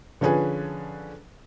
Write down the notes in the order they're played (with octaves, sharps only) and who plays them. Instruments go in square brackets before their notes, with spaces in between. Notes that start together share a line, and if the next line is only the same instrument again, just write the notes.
[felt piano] D3 F3 C#4 G#4 B4 G#5